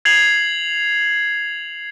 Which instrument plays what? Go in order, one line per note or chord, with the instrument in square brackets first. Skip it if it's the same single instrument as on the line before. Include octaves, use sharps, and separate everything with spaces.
[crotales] G#6 C7 F7 F#7